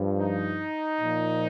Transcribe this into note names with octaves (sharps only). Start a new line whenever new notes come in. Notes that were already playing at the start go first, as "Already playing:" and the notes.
Already playing: G2 F3
D#4
A#2 F3